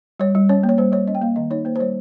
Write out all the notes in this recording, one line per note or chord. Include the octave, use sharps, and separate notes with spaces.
G3 C#5
G3
C#4 C#5
A#3
C#5
G3 C5
G3 C#5
C#4 D#5
G5
A#3 F5
D#3 D#5
D#4 C#5
A#3 C5
C5
G3 C#5